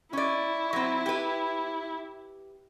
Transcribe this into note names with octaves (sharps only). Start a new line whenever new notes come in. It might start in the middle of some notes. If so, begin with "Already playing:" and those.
C#4 E4 D5
F#3 C4
G4 B4